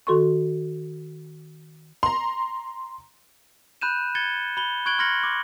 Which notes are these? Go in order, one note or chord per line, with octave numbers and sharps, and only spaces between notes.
D#3 F#4 A4 C6 C#6
A#5 C6
B5 F#6 G6 D#7 E7
G#6 A6 C#7 G7
B5 G7
C#6 F#6 G#6 D7 F#7 G7
C6 F6 G#6 A#6 C#7 F#7
D6